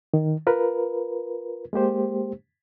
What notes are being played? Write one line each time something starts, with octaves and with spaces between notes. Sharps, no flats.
D#3
F4 A#4 B4
G#3 A#3 G4 C5